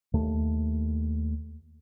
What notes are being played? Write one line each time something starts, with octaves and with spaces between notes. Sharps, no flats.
D#2 A3